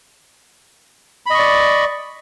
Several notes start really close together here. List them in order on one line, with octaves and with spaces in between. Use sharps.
B5 D#5 C#6 D5